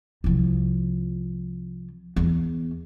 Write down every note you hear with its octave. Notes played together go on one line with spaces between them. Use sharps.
C2 F3
E2